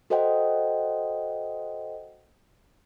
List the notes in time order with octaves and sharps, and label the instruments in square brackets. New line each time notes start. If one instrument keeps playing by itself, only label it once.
[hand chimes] F#4 A4 C5 D#5 F#5 G5